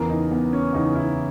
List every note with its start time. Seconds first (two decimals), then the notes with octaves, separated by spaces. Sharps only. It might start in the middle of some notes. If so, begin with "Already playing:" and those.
Already playing: E2 C#3 E3 A#4
0.10 D#4
0.31 B3
0.53 C#4
0.73 E2 C#3 E3 D#4
0.95 E4